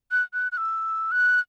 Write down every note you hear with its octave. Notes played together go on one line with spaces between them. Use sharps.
F#6
F#6
F#6
E6
F#6